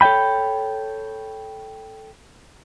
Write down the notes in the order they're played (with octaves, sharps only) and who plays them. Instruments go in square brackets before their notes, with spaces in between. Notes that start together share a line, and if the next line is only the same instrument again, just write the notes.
[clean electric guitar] A4 C#5 E5 G5 B5